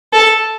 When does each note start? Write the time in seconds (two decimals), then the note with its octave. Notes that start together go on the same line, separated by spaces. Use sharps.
0.13 A4